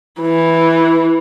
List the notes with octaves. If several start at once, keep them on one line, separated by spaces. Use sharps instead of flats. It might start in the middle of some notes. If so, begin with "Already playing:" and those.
E3